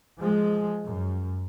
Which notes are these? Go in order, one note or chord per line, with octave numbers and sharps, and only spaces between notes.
F3 G#3
F#2